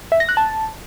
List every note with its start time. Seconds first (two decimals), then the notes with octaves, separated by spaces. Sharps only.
0.12 E5
0.20 A#6
0.29 F#6
0.37 A5